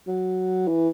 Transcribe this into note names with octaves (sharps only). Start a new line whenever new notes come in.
F#3
E3